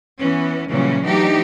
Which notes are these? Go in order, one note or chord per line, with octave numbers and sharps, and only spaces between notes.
E3 B3 C#4
A#2 C#3 E3 F#3 G3 C#4
E3 F#3 A3 D4 D#4 G4